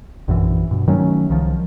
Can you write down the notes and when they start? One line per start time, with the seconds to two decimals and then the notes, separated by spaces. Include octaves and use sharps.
0.28 A#1 F#2 E3
0.71 G2 B2
0.88 D#3 F#3 A3 C#4
1.29 C2 D#3 F3